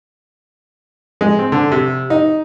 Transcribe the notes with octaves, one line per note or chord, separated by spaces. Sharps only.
G#3
C4
D3
C3
D#4